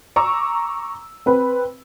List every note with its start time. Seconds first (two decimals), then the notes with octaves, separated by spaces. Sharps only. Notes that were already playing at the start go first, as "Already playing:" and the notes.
0.16 A#5 C#6 D6 E6
1.26 C4 B4